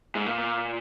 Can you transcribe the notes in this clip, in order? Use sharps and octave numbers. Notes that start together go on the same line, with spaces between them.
G#2
A#2